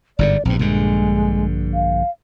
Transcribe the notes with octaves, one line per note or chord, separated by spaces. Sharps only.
G1 G#2 D3 D5
A#1 G2 C4
A#1 G2 D3 G#3
F5